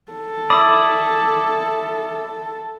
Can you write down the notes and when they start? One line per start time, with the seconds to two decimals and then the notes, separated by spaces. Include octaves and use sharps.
0.12 A4
0.50 E4 D5 B5 D#6